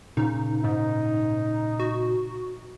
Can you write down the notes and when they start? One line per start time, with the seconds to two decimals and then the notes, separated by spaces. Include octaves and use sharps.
0.17 A#2 C#3 D#4
0.64 G#2 D#4
1.80 F#4